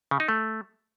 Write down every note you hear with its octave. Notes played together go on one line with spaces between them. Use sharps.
C#3
D#4
A3